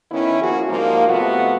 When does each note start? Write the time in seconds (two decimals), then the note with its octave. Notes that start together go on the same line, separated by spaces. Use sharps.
0.11 D#3 B3 C#4 E4
0.41 F3 A#3 F#4 G#4
0.69 G#2 F3 G3 A#3
1.08 C3 F3 A3 B3 F#4